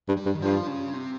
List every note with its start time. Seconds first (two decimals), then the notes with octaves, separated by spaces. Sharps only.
0.08 G2
0.17 G3
0.26 G2
0.34 D#3
0.41 G2 F3
0.67 C#3
0.93 C3